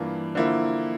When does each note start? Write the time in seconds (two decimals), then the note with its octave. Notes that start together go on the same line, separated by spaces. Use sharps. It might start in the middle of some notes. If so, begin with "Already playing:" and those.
Already playing: G2 E3 A#3 D4 F4
0.35 D3 F3 A#3 E4